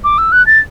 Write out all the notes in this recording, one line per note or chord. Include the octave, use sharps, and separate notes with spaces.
D6
E6
F#6
A6